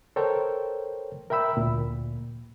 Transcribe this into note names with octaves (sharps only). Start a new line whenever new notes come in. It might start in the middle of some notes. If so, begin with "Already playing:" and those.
A4 A#4 C5 C#5 G5
A#4 E5 G5 B5 E6
D2 A#2